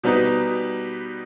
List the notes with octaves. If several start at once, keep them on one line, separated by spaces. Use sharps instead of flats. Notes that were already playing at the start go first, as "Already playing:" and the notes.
B2 G3 B3 D#4